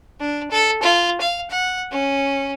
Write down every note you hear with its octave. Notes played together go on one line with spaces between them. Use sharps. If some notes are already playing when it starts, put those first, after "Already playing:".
D4
A4
F4
F5
F#5
C#4